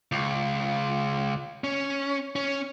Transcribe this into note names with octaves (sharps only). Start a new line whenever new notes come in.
C#2
C#4
C#4